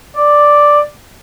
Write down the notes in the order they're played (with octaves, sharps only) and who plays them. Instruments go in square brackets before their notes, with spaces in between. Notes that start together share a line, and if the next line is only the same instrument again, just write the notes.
[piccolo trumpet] D5